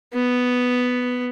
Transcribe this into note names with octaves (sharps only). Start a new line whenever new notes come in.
B3